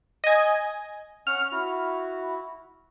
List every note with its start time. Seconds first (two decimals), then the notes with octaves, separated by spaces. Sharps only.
0.24 D#5 G#5
1.27 C#4 F#5 F6
1.52 E4 F#4